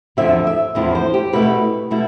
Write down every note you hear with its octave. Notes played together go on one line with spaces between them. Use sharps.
E2 D3 F3 C4 E4 E5
E5
E2 D3 F3 C4 E4
C5
G4
B2 A3 E4 B4
B2 A3 E4